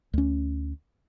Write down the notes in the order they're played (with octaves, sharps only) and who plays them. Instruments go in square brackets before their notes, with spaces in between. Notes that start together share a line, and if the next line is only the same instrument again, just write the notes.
[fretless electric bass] D2 C#4